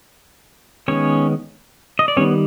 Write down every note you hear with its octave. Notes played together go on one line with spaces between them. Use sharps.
D#3 G#3 B3 C#4 C#5
D#5
D5
D#3 G3 B3 C#4 C#5